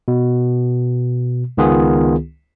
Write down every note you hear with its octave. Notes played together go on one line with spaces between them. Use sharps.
B2
C#2 D#3 B3 F4 G#4